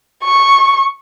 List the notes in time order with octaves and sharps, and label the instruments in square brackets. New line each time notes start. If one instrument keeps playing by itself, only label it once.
[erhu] C#6